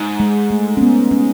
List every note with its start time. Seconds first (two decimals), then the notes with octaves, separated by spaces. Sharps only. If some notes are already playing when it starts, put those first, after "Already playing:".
Already playing: G#2
0.20 G#3
0.50 A3
0.77 C#4
0.81 B3
1.11 C#4